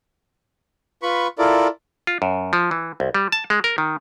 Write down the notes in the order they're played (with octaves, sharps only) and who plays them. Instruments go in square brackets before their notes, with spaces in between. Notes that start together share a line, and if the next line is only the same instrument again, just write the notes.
[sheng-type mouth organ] F4 B4 B5 C#6
E4 F4 A4 A#4 D5
[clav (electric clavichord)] F4
F#2
F3
E3
C2
G3
A5
G#3
A#4
D#3